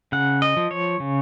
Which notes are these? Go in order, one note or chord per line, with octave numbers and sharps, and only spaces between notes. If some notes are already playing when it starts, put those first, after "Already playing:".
C#3 F#5
D#5
F3
C#5
C#3